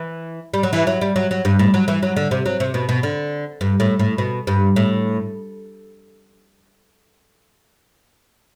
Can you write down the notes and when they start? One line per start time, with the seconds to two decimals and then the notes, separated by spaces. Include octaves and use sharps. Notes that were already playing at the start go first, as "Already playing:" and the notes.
Already playing: E3
0.54 G3
0.63 F#3
0.73 E3
0.87 F#3
1.01 G3
1.16 F#3
1.31 F#3
1.45 G2
1.59 A2
1.74 F#3
1.88 E3
2.03 F#3
2.17 D3
2.31 C3
2.46 F#3
2.60 C3
2.74 B2
2.89 B2
3.03 D3
3.61 G2
3.80 A2
3.99 A2
4.18 B2
4.47 G2
4.76 A2